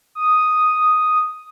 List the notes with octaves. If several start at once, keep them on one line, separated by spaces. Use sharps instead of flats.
D#6